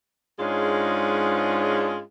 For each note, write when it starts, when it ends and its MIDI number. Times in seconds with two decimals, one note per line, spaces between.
0.39 2.00 44
0.39 2.00 56
0.39 2.00 61
0.39 2.00 62
0.39 2.00 65
0.39 2.00 68